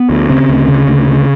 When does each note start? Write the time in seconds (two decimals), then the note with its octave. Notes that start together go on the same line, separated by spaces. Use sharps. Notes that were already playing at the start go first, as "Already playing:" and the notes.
Already playing: B3
0.10 D2
0.29 C#3 C4
0.49 D2
0.68 C#3
0.88 D2
1.08 C#3